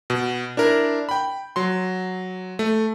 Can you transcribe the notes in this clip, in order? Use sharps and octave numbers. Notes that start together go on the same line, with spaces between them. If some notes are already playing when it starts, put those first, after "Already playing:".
B2
D4 E4 A#4
G5 B5
F#3 C6
A3